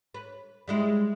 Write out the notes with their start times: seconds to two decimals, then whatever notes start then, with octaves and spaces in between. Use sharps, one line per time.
0.14 B4
0.68 G3 G#3 E4